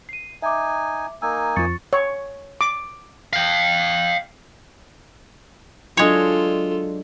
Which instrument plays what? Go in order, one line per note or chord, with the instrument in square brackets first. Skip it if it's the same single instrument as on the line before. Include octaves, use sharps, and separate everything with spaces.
[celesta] C7 D#7
[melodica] D#4 G#5 [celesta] E5 D6
[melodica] A#3 D#4 G#5 [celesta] E6
[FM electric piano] F2 F3 [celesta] C#6 A6 C#7
[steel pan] C#5
D6
[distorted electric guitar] F5 G5
[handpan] F#3 D4 [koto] G#3 C#5 [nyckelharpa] F4 A4